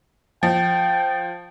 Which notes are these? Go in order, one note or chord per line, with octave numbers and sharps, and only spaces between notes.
F3 G5